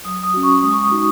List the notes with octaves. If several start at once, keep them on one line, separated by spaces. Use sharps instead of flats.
F#3 D#6
D#6
C#4 F#4
C#6
G#3 D#6
C#6
D#6
D#4 F#4